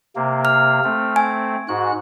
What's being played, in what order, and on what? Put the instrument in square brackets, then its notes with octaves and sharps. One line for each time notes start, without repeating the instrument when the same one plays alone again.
[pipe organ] C3 A#3
[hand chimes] F6
[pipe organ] A3 C4
[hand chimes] G#5
[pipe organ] G#2 F#4 F#6